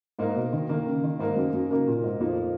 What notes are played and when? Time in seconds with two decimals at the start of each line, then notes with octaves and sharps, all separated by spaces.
0.19 G#2 A#3 D#4 A#4
0.35 B2
0.53 D#3
0.69 D#3 A#3 D#4 A#4
0.86 C#3
1.04 D#3
1.19 G#2 A#3 D#4 A#4
1.36 F#2
1.53 F#2
1.70 C#3 A#3 D#4 A#4
1.88 A#2
2.04 G#2
2.20 F2 F3 A#3 D#4